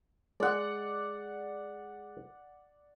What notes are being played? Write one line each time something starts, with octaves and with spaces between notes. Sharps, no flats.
G#3 D5 F#5